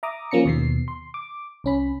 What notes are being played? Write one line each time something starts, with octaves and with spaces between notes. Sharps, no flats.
E5 A#5 D6 D#6
F3 A#3 C#4 A#5 C#7
D#2 B2 C7
C6
D6
C2 C#4 B5